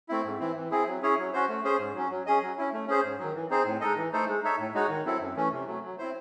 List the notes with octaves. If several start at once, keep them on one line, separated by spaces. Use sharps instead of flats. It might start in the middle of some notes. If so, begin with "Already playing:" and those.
A3 C4 E4
G#2
E3 C4 E4
E3
C4 E4 G#4
F#3
C#4 E4 G#4 C#5
F#3
C#4 F#4 C5
A3
C#4 G#4 C5
G#2
F#3 C#4
F#3
C#4 G#4 D#5
F#3
C#4 E4
A3
C#4 G#4 C5
G#2
D#3 F#3
E3
C4 D#4 G#4 C5
A2
G#3 D#4 A4 D#5
E3
A3 D#4 A4 C5
G#3
D#4 A4 C#5 E5
A2
G#3 D#4 F#4 C#5
D#3
F#3 C4 E4 A4
F#2
E3 A3 C#4
C3
F#3 A3
F#3
C4 E4 C5